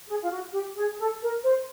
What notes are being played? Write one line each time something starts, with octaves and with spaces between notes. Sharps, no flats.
G#4
F4
F#4
G4
G#4
A4
A#4
C5